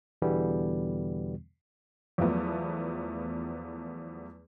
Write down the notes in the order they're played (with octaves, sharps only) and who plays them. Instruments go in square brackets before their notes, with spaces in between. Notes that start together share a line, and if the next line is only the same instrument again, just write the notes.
[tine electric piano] E2 B2 D3 E3 G3 B3
[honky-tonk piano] E2 F3 F#3 A3 B3